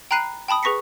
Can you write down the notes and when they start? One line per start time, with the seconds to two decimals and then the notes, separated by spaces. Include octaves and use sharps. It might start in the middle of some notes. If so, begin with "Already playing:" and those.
0.11 G5 A#5 B5 F#6 C7 D#7
0.48 G5 A5 B5 D#6
0.63 G#4 B4 C#6 A#6 B6 C#7